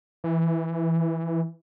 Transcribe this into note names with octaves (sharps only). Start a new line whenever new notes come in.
E3